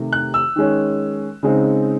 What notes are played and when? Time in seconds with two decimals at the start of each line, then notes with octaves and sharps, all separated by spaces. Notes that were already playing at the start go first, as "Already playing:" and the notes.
Already playing: C3 D#3 A3
0.13 F#6
0.34 E6
0.56 D#3 G#3 C#4
1.43 C#3 G#3 C4 D#4